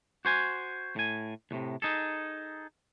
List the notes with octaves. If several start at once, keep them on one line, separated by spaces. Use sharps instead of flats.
F#4 C5 G#5
A2 G#5
E2 A2 C3
D#4 G#4 A4